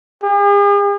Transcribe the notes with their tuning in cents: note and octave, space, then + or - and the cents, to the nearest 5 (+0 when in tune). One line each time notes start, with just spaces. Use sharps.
G#4 -45